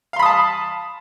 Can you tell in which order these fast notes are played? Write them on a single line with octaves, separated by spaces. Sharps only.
F5 C6 B5 D#6 A5